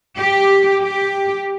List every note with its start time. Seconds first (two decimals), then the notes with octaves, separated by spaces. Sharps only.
0.17 G4
0.82 G4